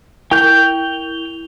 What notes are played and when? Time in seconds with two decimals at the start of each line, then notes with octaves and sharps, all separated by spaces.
0.31 E4 G5 G6 F7 G7